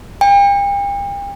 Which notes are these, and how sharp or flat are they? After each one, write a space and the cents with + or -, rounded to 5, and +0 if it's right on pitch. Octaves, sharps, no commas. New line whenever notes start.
G5 +40